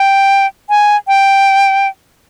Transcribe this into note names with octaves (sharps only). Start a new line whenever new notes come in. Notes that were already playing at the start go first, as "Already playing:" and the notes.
Already playing: G5
G#5
G5